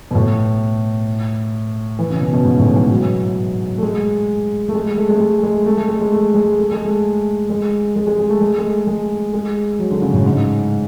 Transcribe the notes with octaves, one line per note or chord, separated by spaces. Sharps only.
B2
A2
E3
C#3
B2
B2
G#2
A2
E3
F#3
A3
G#3
A3
G#3
A3
G#3
A3
G#3
G#3
A3
A3
G#3
G#3
A3
G#3
A3
G#3
A3
G#3
G#3
G#3
G#3
A3
G#3
G#3
A3
G#3
G#3
F#3
D3
C#3
A2
G#2